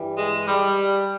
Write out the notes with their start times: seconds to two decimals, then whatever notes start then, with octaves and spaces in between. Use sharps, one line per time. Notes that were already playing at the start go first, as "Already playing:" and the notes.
Already playing: G2 E3 G3
0.18 G#3
0.47 G3